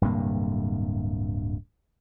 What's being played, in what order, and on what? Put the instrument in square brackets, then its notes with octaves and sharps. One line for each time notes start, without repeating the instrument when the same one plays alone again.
[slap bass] D1 G2 C3 A#3